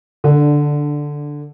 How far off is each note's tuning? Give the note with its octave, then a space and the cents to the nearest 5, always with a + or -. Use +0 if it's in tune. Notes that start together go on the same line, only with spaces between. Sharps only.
D3 +0 D4 +10